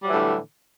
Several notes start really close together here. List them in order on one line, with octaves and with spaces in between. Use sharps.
G3 F#3 E3 A2 D3